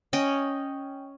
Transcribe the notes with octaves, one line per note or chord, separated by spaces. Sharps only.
C#4 D#5 G5